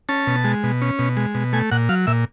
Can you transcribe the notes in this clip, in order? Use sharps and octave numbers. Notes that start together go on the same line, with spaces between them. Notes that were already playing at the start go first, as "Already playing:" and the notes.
C#4 A5
B2
G#3
B2
C#4
B2
G#3
B2
A3 G#5
A#2 F#5
F#3 F5
A#2 E5